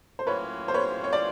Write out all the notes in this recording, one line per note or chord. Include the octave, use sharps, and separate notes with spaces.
C5
A2 F#3 A#3 C#4 F4 B4 C#5
C5
B4 C#5
C#5
D5